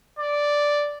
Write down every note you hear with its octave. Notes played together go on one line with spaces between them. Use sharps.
D5